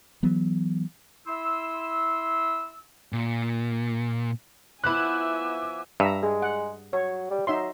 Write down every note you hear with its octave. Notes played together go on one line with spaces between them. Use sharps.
E3 F#3 B3
E4 C6 E6
A#2
F3 B3 E4 E5 G#5 D6 F#6
G2 E5 A#5
G#3 G#4
F#5
F#3 C#5
G3
F#3 D#4 E5 C6